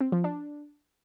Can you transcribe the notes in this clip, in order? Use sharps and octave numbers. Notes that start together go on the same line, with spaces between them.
C4
F3
D4